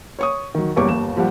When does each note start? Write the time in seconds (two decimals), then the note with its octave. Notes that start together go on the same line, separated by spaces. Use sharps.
0.19 C#5 C#6 D#6
0.55 D#3 F#3
0.76 F#1 E2 G3 C#5 C#6 D6
0.89 G1 D#2 E7
1.16 D#2 F3 G3 G4 F#5